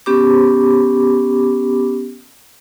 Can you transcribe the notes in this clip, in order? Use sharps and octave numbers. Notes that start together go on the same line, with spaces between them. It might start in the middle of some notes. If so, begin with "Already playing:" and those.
B3 C#4 G4 B5 D6